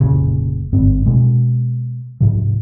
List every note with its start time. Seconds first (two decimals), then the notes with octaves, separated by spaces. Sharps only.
0.01 F1 A#2 C#3
0.73 G1 G#2 C4
1.06 B2 G#3
2.21 G#2 C3 F3